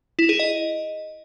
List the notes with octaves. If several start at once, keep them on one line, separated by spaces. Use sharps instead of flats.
E4
G#4
D#5